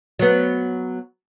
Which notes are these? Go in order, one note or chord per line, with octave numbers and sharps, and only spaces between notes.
F#3 B3